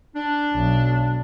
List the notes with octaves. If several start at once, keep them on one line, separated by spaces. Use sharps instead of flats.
D4
B1